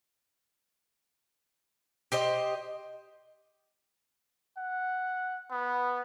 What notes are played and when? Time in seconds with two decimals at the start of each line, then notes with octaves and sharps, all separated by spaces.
2.12 G4 C5 D#5
4.58 F#5
5.51 B3